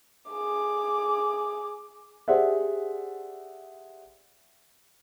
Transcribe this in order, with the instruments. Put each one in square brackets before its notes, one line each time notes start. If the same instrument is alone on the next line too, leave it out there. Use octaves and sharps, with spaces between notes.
[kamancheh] G#4 D6
[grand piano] G4 G#4 C5 D5 E5 F#5